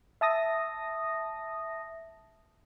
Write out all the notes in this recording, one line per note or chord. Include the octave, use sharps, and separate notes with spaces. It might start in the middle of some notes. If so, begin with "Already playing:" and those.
E5 A5 D#6 A#6